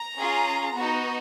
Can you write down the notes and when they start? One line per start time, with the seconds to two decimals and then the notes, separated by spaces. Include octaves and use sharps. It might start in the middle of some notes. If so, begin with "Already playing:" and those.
Already playing: A#5
0.18 C#4 F4 G#4
0.74 B3 D#4 F#4